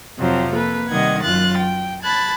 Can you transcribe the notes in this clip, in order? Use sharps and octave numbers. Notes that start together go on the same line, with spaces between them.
F2 C3 F3 F#3 C4
A#3 A4 B4
C3 D#3 G3 D#5 F#5 G#6
F#2 F#3 F4 F#6 A6
G5
A5 B5 F#6 G#6 A6